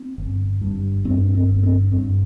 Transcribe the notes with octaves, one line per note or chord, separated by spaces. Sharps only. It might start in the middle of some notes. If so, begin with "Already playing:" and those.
Already playing: C4
G1
G2
G2 C4
C4
G1
C4
G2